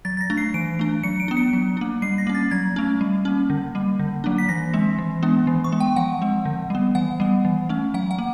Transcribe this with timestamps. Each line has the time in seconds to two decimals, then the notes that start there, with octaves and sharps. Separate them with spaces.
0.05 F#3 A6
0.17 A6
0.21 A#6
0.30 A3 D4
0.37 C7
0.54 E3 D7
0.79 A3 D4
1.03 F#3 C#7
1.20 D7
1.28 B3 D4
1.37 C#7
1.53 F#3
1.77 A#3 D4
2.02 G3 C7
2.18 A#6
2.27 A#3 C#4
2.35 A6
2.51 F#3 G#6
2.76 A3 C#4
3.01 G3
3.25 A#3 C#4
3.50 D3
3.75 G3 A#3
3.99 D3
4.24 F#3 A#3 D4
4.38 B6
4.49 E3 A#6
4.74 G#3 C4
4.98 E3
5.23 G#3 B3 D4
5.47 E3
5.64 C#6
5.72 G#3 B3
5.80 G5
5.96 F3 F#5
6.22 G#3 C4
6.45 D3
6.70 G3 B3
6.95 E3 F#5
7.20 G3 B3
7.45 E3
7.69 A3 C#4
7.94 F#3 F#5
8.11 F#5
8.18 A#3